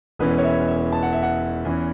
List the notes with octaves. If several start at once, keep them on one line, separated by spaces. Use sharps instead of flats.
E1 E2 E3 C#4 B4
C#5
E5
E5
A5
F#5
E5
F#5
E2 E3 C#4